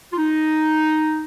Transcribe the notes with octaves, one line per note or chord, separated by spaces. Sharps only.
F4
D#4